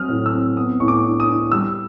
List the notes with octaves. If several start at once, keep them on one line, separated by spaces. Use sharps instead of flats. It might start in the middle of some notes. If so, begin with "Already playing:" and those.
Already playing: F#3 C4 D#6 F6
A2
E6
C4
B3 D#6
A2 C#6
D6
D4
D#6
D4
G3 E6